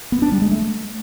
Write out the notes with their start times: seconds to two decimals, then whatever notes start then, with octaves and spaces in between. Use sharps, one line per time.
0.12 B3
0.22 D4
0.32 G3
0.42 G#3
0.51 A3